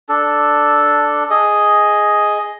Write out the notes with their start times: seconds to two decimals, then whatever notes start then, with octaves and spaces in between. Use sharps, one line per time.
0.09 D4 A4
1.30 G#4 D#5